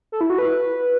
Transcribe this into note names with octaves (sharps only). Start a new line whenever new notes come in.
A4
E4
F#4
B4